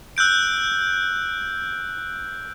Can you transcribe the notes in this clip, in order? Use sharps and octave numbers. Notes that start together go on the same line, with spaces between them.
E6 F#6 G6 D7